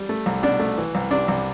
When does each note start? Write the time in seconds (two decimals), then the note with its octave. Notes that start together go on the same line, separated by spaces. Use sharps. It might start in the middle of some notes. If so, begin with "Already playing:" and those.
Already playing: G3
0.09 A3
0.26 C2
0.43 B2 D4
0.60 A3
0.78 E3
0.95 C2
1.11 C3 D4
1.28 C2